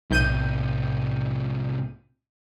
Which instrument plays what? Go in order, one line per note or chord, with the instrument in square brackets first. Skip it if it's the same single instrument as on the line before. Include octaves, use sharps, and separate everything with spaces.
[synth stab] B1 G6 D#7 [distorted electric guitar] A2 C3